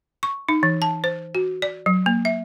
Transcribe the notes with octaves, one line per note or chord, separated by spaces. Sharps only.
C#6
D#4
E3
A5
C5
F#4
D5
F#3
A#3
E5